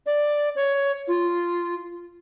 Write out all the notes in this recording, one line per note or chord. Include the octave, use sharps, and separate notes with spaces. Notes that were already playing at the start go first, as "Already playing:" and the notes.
D5
C#5
F4